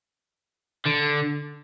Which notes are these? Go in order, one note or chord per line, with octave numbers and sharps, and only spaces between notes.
D3